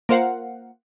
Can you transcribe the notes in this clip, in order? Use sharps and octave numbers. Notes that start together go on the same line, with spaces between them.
A#3 F4 A#4 C5 F5 F#5